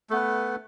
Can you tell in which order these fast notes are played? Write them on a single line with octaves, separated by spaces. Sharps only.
A3 B3 B4